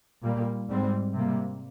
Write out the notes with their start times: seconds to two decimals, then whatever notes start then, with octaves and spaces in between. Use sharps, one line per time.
0.24 A#2 G3 A#3
0.69 G#2 G3 C4
1.14 C3 G3 A#3